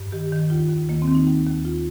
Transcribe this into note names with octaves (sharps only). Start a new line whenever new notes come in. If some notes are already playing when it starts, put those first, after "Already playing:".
Already playing: G2
D#3 G4
D#3
D#2 F4
D#2
D#3 A#3
C4
D#3
D#4
D#2 D#4
D#2
F4